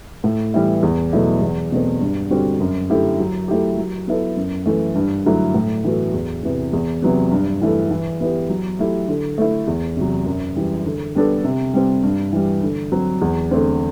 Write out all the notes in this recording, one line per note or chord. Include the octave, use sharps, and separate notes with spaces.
A2
E3 G3 B3 E4
E2
B2 F#3 A3 E4
E2
B2 A3 C4
G2
D3 G3 C4 F#4
F#2
D3 A3 E4 G4
F#3
A3 E4 G4
F#3
B3 E4 A4
F#2
E3 A3
G2
D3 F#3 A3 E4
A2
E3 B3 F#4 A4
E2
C3 E3 B3
E2
C3 F#3 B3
G2
E3 A3 E4 A4
E3
B3 E4 G4
F#3
A3 E4 G4
D3
A3 E4
E2
C3 F#3
F#2
E3 G3
D3
G3 B3 D4 A4
C3
G3 C4
G2
E3 G3
D3
F#3 C4
E2
D3 A3 C4